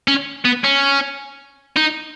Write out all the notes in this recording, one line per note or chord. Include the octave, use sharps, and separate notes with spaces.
C#4
B3
C#4
D#4